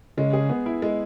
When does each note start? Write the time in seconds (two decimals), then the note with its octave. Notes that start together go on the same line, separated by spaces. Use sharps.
0.18 C#3 G#3
0.33 G#4
0.49 B3
0.66 E4
0.82 G#3